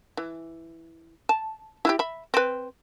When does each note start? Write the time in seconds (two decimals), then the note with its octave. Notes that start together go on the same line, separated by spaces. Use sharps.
0.17 E3
1.29 A5
1.85 E4 F#4 G4
1.99 E5 B5
2.34 C4 B4